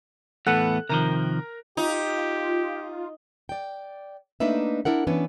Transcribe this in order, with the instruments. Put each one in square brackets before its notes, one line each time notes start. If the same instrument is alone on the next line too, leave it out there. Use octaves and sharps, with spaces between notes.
[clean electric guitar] E2 A2 B3 [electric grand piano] A4 F#5 F#6
[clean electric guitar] C3 D#3 F3 [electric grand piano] A#4 A#5
[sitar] D#4 [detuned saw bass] F4 [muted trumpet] G4
[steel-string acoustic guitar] D5 G5
A3 A#3 D4 D#4 B4 E5
D4 E4 A#4 F#5
E3 B3 C#4 D4 B4